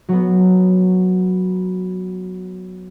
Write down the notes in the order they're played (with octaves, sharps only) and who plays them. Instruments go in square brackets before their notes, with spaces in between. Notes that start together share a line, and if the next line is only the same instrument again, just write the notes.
[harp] F#3 B3